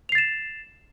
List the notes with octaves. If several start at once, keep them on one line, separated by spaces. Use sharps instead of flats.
A6 C7 E7 F7